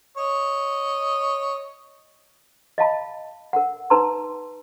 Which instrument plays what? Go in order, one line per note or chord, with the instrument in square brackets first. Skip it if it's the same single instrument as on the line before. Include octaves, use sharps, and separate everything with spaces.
[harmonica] C#5 D#5
[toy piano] D#5 F5 A5 B5
A#4 F#5
D#4 B4 A5 A#5 C6